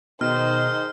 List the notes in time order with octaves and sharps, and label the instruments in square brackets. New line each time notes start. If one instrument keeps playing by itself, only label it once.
[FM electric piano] B2 [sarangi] D#3 [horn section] D#4 G#4 C5 [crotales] F6